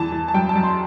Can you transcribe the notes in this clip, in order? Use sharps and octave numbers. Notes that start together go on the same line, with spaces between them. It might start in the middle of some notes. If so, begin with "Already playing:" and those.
Already playing: E2 E3 A5
E3
A5
F#2 G5
A5
F#2
C6